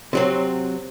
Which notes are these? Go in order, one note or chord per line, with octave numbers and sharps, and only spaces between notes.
C3 F#3 C4